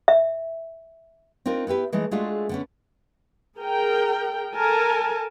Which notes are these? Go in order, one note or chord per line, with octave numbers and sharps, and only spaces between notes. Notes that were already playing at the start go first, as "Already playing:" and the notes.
E5
C4 D4 D#4 F4 A#4
B3 E4 G4 B4
E3 G#3 A3 D#4
G#3 A3 D4 F4 F#4 G#4
D3 B3 C#4
G#4 A#4 G5
A4 A#4 G#5 A5